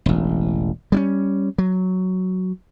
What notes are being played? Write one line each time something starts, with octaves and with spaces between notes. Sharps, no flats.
E1 A1
G3 C4 C#4
F#3